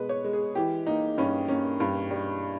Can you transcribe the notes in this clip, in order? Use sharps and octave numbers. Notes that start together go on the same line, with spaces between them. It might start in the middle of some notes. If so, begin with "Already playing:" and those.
Already playing: B2 G#3 B4
C#5
G#3
G#4
E3 G4
A#3 D#4
G2 C#4
A#3 C#4
G2
G3